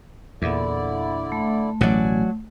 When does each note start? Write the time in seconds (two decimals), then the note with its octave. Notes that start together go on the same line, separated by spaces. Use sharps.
0.42 E2 A#2 D3 E4 D5
1.32 A3
1.81 A1 B2 F#3 D5 G#5